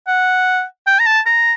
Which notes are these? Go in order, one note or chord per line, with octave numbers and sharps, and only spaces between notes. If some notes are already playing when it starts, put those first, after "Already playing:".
F#5
G5
A#5
A5
A#5